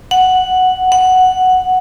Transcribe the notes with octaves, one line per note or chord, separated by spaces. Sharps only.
F#5
F#5